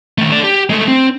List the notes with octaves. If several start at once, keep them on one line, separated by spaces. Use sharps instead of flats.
D#3 A3
A4 D5
G4
G#3 A3
C4